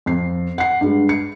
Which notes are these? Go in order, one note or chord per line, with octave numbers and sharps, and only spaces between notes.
F2 C7
F#5 C7
G2 G#3
C#7